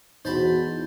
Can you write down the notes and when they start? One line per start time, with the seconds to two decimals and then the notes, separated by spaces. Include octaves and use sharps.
0.25 E2 D#4 F#4 C5 A5 B5